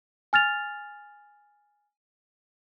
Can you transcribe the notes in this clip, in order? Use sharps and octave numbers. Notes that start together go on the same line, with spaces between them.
G#5 F6 A6 F7